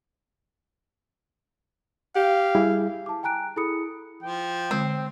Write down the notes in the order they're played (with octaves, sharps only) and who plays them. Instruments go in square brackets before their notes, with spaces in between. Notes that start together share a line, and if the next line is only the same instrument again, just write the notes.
[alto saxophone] G4 [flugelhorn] F5
[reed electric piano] G3 E4 G#4
[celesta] A5 D6
G5 G#5 A#5 F#6 D7
E4 G#4 A4 B5 D#6 C#7
[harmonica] F3 [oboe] G5
[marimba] D3 G#3 [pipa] C4